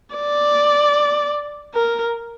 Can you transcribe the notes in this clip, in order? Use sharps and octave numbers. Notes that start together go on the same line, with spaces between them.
D5
A#4